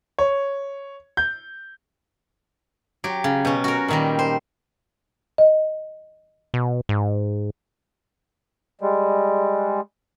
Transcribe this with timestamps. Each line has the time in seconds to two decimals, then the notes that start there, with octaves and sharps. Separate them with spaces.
0.19 C#5
1.17 G6
3.04 F#3 G4
3.24 C#3
3.45 B2 C#4
3.64 F#4 A#4
3.88 A#2 D#3 G3
4.19 C5
5.38 D#5
6.54 B2
6.89 G#2
8.81 G3 G#3